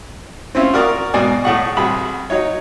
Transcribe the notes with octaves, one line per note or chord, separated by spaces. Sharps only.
C4 C#4 E4 F4
F#4 A#4 D5 C#6 D#6 F6
G#2 B2 D5 G#5
A2 A3 G#4 F#5 C#6
C2 F#4 G#4 B5
F#3 D#4 C#5